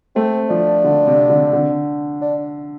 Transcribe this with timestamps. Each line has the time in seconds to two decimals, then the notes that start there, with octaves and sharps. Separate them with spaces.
0.16 A3 C4
0.50 F3 D4
0.84 D3
1.07 C3
1.30 D3
1.53 D3
2.22 D4